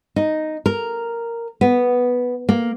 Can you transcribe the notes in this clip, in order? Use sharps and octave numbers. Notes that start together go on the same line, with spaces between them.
D#4
A#4
B3
A#3